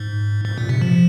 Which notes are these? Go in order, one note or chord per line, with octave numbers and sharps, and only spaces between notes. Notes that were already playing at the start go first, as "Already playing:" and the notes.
Already playing: G#2
G#2
A#2
C3
F3